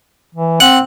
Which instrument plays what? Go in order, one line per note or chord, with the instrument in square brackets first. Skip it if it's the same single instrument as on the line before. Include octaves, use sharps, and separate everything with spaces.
[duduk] E3
[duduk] C4 [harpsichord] F#5